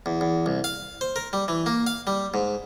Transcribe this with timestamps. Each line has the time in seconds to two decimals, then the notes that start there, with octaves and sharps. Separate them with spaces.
0.06 E2
0.21 E2
0.46 C2
0.64 F5
1.01 C5
1.16 A#4
1.33 G3
1.48 E3
1.66 A#3
1.87 F5
2.07 G3
2.34 G#2